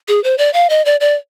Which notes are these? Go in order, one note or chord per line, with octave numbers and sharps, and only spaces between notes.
G#4
C5
D5
F5
D#5
D5
D5